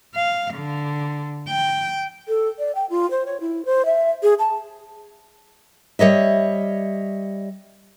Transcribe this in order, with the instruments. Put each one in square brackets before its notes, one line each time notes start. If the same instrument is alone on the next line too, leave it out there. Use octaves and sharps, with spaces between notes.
[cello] F5
D3
G5
[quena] A4
D5
G5
F4
C5
C#5
E4
C5
E5
G#4
A5
[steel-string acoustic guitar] G3 C#5 D#5 E5